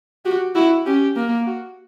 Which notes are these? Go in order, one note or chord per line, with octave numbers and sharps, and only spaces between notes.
F#4 G4
E4 F#4
C#4 G4
A#3
F#4